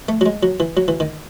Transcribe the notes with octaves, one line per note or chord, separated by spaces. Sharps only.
A3
F#3
G#3
F#3
E3
F#3
E3
D#3